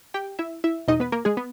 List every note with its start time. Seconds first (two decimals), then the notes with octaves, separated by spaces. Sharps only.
0.14 G4 G5
0.39 E4 E5
0.64 E4 E5
0.88 E2 B2 D#4 D#5
1.00 B3 B4
1.12 A#3 A#4
1.25 G#3 G#4
1.37 B3